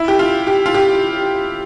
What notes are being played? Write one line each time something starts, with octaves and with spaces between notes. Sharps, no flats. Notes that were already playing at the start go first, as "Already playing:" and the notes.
Already playing: E4
G4
F4
G4
F4
G4